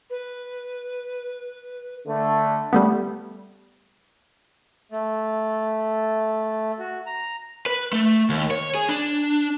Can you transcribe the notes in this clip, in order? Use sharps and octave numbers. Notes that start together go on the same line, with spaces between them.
B4
D3 A3
G3 A3 B3
A3
F#4
A#5
B4
A3
D#2
C#5
G#4
D4